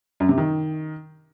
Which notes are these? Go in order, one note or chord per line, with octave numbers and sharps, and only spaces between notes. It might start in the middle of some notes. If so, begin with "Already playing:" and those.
F#2
C3
D#3